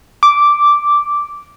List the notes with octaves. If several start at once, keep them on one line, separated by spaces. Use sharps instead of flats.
D6